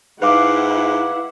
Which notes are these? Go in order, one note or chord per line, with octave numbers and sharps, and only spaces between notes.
G#2 E4 B4 F5 F#5 D6